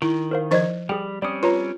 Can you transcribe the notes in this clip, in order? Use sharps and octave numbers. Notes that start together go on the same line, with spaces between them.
D#3 E4
A#4 C5 F5
F3 D#4 C5 D5 D#5 G#6
G3 G#4 G5
G3 C4 C#4 D5 D#6
F4 B4 C#5 A#5